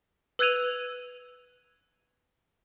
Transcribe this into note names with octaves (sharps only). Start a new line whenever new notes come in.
B4 E6 F#6 G#6 D#7 F7